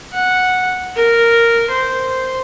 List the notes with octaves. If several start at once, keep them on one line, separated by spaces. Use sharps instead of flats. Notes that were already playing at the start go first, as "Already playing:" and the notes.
F#5
A#4
C5